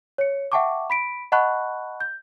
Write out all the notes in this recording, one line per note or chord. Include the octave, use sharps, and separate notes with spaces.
C#5 C#7
E5 F#5 G5 A5 C#6 D6
B5 B6 D7
D#5 F#5 A5 B5 C#6 F#6
G6